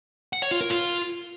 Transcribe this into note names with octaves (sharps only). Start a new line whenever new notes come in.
F#5
C#5
F4
A#4
F4